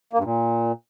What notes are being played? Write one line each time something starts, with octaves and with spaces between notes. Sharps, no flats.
A#3
G2
A#2